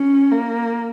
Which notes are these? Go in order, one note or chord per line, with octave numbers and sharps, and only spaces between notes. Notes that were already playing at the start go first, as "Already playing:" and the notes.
Already playing: C#4
A#3